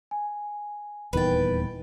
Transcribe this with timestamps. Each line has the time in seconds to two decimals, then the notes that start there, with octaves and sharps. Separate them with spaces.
0.11 G#5
1.13 D#1 E2 D#3 B4 G5 B5 A6